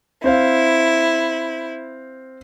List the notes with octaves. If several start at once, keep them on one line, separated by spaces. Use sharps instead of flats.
C4 E4 C5 F5